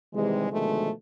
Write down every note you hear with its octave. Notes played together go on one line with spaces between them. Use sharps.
C3 D#3 E3 G3 G#3
B2 D3 D#3 F3 G#3 A3